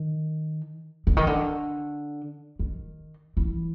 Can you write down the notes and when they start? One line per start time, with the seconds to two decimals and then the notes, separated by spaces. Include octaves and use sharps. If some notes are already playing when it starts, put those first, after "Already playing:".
Already playing: D#3
1.07 D3
1.17 D#3
1.27 D3
2.59 D#3
3.37 E3